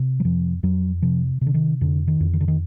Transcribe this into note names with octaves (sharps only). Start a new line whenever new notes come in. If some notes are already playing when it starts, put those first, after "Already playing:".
Already playing: C3
F#3
F2 F3
F2 F#3
C3 F3
C3
D3
D#3
F2 D3
D#3
F2
D#3
D3
D#3